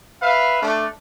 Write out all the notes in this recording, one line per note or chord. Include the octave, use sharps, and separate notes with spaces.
B4 E5 F5
A3 D4